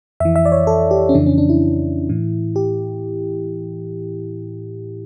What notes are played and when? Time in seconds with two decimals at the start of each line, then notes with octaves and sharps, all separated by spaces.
0.20 F2 E3 E5
0.36 E5
0.45 D5
0.52 C#5
0.67 A4
0.91 G4
1.09 C#4
1.14 F2 C#3 E3 D4
1.26 C#4
1.38 D4
1.49 E4
2.09 A2 E3
2.56 G4